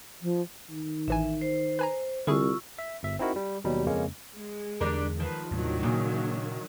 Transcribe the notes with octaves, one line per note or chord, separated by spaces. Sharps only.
F3
D#3
A1 E3 E5 G#5
C5
B4 G#5 A#5
C2 D3 E4 F4 G#4 C#6 E6
E5
G1 E5
C4 D#4 E4 F#4 A#4
G3
D#2 B2 F#3 G3
F2 C#3 G#3 A#3 C#4
G#3
E2 D3 E3 G3 D4 A#4
D#3 F3 B4
D#2 A2 C3 D#3 F#3 D4
A#2 C#3 A#3